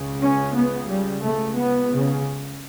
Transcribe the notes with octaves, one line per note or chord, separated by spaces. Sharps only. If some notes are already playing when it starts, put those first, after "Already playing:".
Already playing: C#2 C#3
C#4
B3
G3
C#2 C#3 A3
B3
C#3